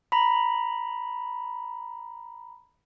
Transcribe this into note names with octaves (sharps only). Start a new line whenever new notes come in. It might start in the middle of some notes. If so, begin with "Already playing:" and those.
A#5 B5